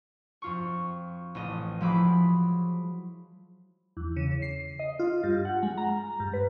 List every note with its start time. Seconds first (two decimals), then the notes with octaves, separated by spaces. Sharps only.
0.42 F2 F4 C#6
1.35 A1 D#5
1.81 F3 F#3 G#3 E4 B5 D6
3.97 E2
4.16 C#3
4.42 C7
4.79 D#5
4.99 F4
5.23 G2
5.45 F#5
5.63 G#3
5.78 A#5
6.20 G2
6.34 B4